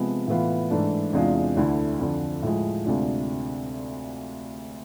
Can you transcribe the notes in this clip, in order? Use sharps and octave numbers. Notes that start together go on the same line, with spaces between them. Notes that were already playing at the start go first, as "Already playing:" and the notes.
Already playing: C3 F3 G#3 B3
A2 E3 B3 F4
G#2 E3 A3 D4
E2 C3 G#3 D4 F4
D2 D3 A3 E4
F2 D3 F3
A2 F3 G#3
D2 C3 G#3 D4 F4